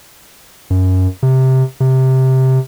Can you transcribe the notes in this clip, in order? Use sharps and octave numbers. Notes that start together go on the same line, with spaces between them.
F#2
C3
C3